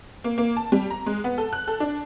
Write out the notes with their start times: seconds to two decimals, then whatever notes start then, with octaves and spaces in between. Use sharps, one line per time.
0.24 A#3
0.38 A#3
0.57 A5
0.72 G3
0.90 A#5
1.06 G#3
1.24 B3
1.38 A4
1.53 F#6
1.68 A4
1.80 D4